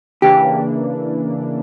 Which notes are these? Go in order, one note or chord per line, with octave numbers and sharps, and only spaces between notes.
C#3 E3 A#3 D4 G4